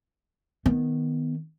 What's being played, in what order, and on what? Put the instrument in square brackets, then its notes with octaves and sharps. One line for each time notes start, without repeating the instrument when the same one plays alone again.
[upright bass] D#3 B3